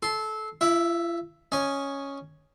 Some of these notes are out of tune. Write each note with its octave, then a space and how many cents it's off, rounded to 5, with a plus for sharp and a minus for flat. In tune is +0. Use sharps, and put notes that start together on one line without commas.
A4 -20 C6 +0
F4 -45 E5 +0
C#4 +0 D#5 +0 G#5 +0